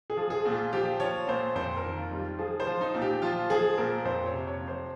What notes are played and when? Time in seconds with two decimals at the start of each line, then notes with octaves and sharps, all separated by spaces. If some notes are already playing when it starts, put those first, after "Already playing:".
0.10 G#4
0.17 F3
0.30 G#4
0.45 A#2
0.52 F4
0.73 F3 G4
1.00 F3 C#5
1.27 A#2 C5
1.55 F2 C5
1.77 A#4
1.84 D#3
1.98 F4
2.11 G3
2.19 F4
2.39 F3 G#4
2.60 C5
2.67 F3
2.81 D#4
2.94 A#2
3.02 G4
3.22 F3 F4
3.50 F3 G#4
3.78 A#2 A#4
4.05 F2 C5
4.26 C#5
4.33 C3
4.47 C#5
4.61 F3
4.68 C5